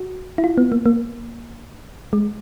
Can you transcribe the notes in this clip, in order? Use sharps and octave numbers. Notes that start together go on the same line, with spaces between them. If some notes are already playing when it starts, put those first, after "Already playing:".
Already playing: F#4
E4
F4
B3
A#3
A#3
G#3